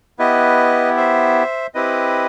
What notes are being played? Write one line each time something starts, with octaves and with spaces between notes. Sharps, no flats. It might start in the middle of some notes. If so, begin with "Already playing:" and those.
B3 E4 G4 B4 D#5
C5 E5
C4 E4 G4 B4 D#5